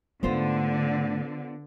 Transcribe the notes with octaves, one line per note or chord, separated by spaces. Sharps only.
G#2 D3 A3 B3 F4 C5